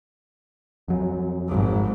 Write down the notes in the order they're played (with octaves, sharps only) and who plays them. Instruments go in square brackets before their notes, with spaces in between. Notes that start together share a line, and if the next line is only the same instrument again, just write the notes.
[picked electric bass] F2 F#3
[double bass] G#1 G#2